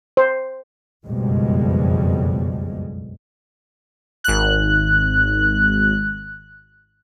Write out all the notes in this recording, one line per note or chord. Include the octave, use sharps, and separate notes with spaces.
C5
F#1 B1 F2 B2 G3 G#3
G#1 F#6